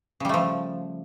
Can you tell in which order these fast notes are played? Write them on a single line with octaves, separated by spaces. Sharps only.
C#3 G3 A3 F3